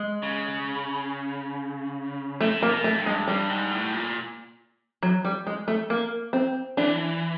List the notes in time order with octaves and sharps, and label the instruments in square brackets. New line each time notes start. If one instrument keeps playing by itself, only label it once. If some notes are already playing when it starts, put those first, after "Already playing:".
Already playing: [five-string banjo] G#3
[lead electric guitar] C#3
[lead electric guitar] C3 [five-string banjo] A3
[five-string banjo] A#3
[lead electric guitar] B2
[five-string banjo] A3
[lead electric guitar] G2
[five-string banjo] G#3
[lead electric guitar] G2 [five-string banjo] G3
[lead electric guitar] G#2
A2
A#2
[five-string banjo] F#3
G3
G#3
A3
A#3
C4
[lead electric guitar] E3 [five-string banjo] D4